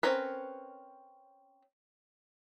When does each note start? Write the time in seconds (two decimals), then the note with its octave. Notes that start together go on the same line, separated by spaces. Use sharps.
0.03 C4 C#4 A#4 B4